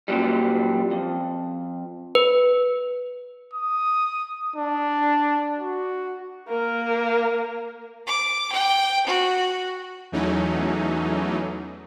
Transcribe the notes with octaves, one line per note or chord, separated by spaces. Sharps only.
F#2 A#2 F#3 G3
F2
B4
D#6
D4
F#4
A#3 A#4
D6
G5
F#4
E2 E3 F#3 A3 C#4 D#4